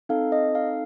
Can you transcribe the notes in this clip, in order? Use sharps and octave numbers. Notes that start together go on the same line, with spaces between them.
C4 D#4 A4 F5
D#5
F5